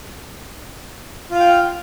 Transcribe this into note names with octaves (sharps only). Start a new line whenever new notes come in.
F4 F5 G5